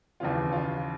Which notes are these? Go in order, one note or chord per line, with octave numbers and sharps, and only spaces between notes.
D#2 C#3 E3 F4
F4